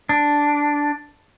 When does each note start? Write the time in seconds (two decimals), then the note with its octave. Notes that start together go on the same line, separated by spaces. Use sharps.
0.09 D4